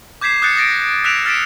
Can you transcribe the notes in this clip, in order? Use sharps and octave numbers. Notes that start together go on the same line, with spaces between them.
D6 G6 G#6 B6 C7 E7
D#6 F#6 G6 A6 C#7
D#6 A6 A#6 D7
E6 F#6 B6 D7 E7 F7
F6 A6 B6 C#7 D7 E7